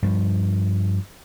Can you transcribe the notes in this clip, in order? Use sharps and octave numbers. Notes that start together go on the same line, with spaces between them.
G2 F3